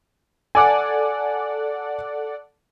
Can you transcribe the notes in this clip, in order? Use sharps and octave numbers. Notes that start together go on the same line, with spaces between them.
A4 D5 F#5 G#5 D6